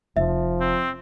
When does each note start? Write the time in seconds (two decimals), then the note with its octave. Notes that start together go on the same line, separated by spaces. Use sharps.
0.17 F1 F3 E5
0.60 C4